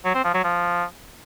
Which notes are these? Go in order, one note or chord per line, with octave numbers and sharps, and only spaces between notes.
F#3
C4
F3
F#3
F3